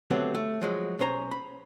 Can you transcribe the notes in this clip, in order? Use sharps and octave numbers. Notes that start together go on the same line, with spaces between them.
D3 F#3 A3 B3 C4 G4
A3
F3 F#3 G#3
B1 C#4 C5 A#5
B5